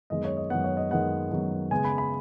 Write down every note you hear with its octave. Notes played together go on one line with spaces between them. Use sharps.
F#2 D#3 G#3 B3 D#5
C#5
D#5
F#2 D#3 G#3 B3 F#5
C#5
D#5
F#2 D#3 G#3 B3 F#5
F#2 D#3 G#3 B3
C#3 G#3 B3 G#5
B5
B5